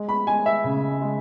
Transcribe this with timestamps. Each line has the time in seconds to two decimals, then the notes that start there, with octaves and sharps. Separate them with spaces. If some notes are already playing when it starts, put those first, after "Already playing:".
Already playing: G#3
0.09 B5
0.27 G#3 G#5
0.46 E5
0.64 C#3
1.01 G#3